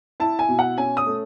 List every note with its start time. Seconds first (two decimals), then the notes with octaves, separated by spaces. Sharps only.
0.20 E4 A5
0.39 G#5
0.49 B2
0.59 F#5
0.78 C#4 G#5
0.97 D#6
1.07 A3